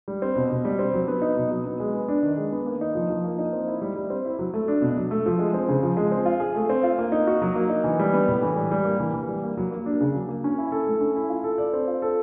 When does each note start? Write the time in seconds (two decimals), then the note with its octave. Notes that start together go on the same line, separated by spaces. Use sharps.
0.08 G3
0.22 C4
0.36 B2
0.50 B2
0.65 G3
0.79 C4
0.94 F#3
1.08 B3
1.22 D#4
1.37 B2
1.51 F#3
1.65 B3
1.80 G#3
1.95 B3
2.08 D4
2.23 D#3
2.37 G#3
2.52 B3
2.66 A#3
2.81 D#4
2.95 F3
3.10 F3
3.24 A#3
3.39 D#4
3.53 C4
3.67 E4
3.82 G3
3.95 G3
4.10 C4
4.25 E4
4.39 F#3
4.54 A3
4.68 D4
4.82 B2
4.97 F#3
5.11 A3
5.26 F3
5.39 G#3
5.54 C4
5.68 C#3
5.83 F3
5.97 G#3
6.12 C4
6.26 F4
6.40 G#4
6.56 A3
6.69 C4
6.83 F4
6.99 A#3
7.12 D#4
7.27 F#4
7.42 F#3
7.55 A#3
7.69 D#4
7.84 E3
7.99 G3
8.13 B3
8.28 A2
8.42 E3
8.56 G3
8.71 G3
8.85 A#3
9.00 E3
9.14 E3
9.29 G3
9.43 A#3
9.57 F#3
9.71 A#3
9.86 D4
10.00 C#3
10.15 F#3
10.29 A#3
10.44 C#4
10.58 E4
10.72 A4
10.87 A3
11.01 C#4
11.16 E4
11.29 F4
11.44 A4
11.58 D5
11.73 C4
11.88 F4
12.02 A4